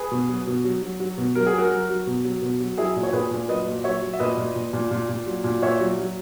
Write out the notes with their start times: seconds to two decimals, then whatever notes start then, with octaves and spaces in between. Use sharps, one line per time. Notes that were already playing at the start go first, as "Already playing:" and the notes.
Already playing: G#4 B4
0.11 B2
0.29 F#3
0.47 B2
0.64 F#3
0.82 F#3
1.00 F#3
1.18 B2
1.35 F#3 A#4
1.47 G#4
1.53 F#3
1.58 F#4 A#4
1.71 F#3
1.89 F#3
2.07 B2
2.25 F#3
2.42 B2
2.60 F#3
2.77 F#3 E4 G#4
2.96 A#2
3.03 C#5
3.13 A#2 G#4 B4
3.31 A#2
3.49 F#3 B4 D#5
3.67 A#2
3.84 F#3 C#5 E5
4.02 F#3
4.13 E5
4.19 A#2 B4 D#5
4.37 A#2
4.56 A#2
4.73 A#2
4.91 A#2
5.09 A#2
5.27 F#3
5.44 A#2
5.62 A#2 C#5 E5
5.80 F#3
5.98 F#3